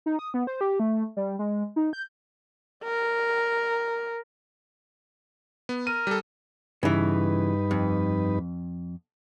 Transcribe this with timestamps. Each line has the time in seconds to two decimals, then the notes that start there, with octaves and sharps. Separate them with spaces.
0.06 D#4
0.19 D#6
0.34 B3
0.47 C5
0.61 G4
0.80 A3
1.17 G3
1.39 G#3
1.76 D#4
1.93 G6
2.84 A#4
5.69 B3
5.87 A#4 D#7
6.07 G3 A4
6.83 G2 C#3 E3 D#4 B4
7.71 F2